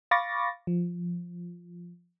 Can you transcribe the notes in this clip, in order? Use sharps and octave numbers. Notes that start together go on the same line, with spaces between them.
F5 B5 C#6 D6 A6 A#6
F3